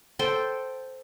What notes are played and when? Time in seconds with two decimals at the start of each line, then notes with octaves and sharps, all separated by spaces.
0.19 A4 C5 G5